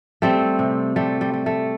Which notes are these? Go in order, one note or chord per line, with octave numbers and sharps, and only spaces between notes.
G3 A3 C4
C3
G3 A3
G3
G3
A3